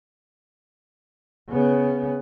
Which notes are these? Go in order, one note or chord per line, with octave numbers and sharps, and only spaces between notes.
C#3 B3